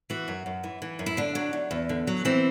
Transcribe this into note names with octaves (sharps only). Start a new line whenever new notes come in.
E3 F#4
F#2
F#2
E3
E3
F#2
E4
D3 D4
F#3
E2
E2
D3
F#3
E3 C4